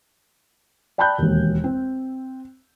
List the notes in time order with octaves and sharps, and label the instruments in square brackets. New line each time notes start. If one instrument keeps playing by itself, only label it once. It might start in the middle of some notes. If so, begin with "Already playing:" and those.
[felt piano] D5 G5 A5 B5 F#6 G6
E1 D#2
C4